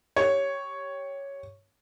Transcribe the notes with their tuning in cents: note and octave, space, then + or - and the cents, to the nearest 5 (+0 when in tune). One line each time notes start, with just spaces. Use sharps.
G4 +0 C#5 +0